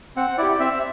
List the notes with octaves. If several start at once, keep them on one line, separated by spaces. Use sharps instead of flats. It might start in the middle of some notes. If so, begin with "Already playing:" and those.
C4 F#5
E4 G4 D5
C4 E5